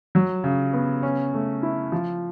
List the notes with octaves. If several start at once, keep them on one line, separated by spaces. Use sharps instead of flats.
F#3
C#3
B3
C#4
A3
E4
F3